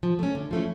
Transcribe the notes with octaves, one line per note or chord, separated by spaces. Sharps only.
F3
A3 C#4
D3
F3 A3 C#4 E4